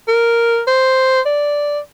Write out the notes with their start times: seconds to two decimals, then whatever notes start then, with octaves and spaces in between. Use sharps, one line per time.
0.08 A#4
0.67 C5
1.26 D5